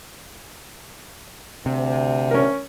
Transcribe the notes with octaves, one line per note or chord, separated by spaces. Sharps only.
D2 C3
C#4 A#4